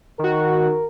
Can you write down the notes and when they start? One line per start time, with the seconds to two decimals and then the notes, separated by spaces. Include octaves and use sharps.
0.19 D#3 F#4 A#4